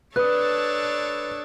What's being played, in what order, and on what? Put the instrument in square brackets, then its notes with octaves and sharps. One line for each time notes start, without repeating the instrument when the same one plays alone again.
[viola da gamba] D4 A4 C#5 [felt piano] B4 [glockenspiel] D#6 F#6